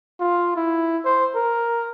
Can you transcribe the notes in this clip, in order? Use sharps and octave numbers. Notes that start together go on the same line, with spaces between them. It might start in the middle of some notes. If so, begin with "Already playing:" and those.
F4
E4
C5
A#4